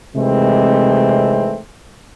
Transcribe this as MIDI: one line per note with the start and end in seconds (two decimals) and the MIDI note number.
0.16 1.58 48
0.16 1.58 51
0.16 1.58 52
0.16 1.58 56
0.16 1.58 57
0.16 1.58 60